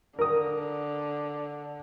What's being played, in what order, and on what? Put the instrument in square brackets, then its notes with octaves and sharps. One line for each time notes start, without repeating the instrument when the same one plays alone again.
[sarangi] D3 [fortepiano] A#4 D#6